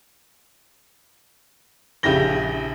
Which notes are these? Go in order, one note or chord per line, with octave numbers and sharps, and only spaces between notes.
A#1 C#3 E4 G4 A#6 G7